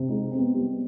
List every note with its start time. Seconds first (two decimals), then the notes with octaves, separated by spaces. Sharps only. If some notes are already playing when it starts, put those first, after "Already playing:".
Already playing: C3
0.09 G#3 D#4
0.32 C4
0.39 B3
0.54 G3